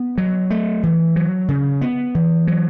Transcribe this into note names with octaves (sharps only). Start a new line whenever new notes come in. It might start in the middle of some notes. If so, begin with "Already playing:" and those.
Already playing: B3
F#3
A3
E3
F#3
C#3
B3
E3
F#3